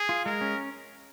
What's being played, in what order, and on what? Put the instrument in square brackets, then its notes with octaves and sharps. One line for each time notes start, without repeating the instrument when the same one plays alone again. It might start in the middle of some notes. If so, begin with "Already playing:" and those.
Already playing: [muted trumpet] G#4
[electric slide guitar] F4
[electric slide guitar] G#3 [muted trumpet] A#4
[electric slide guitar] C#4